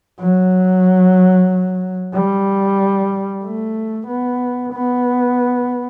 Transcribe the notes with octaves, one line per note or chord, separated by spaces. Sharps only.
F#3
G3
A3
B3
B3